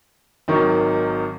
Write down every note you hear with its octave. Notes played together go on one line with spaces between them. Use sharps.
G#1 D#3 F#3 A#4 C#6